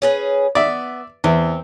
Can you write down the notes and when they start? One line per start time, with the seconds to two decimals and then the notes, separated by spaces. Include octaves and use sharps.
0.02 C#4 G#4 B4
0.55 B3 D5 E5
1.24 E2 C4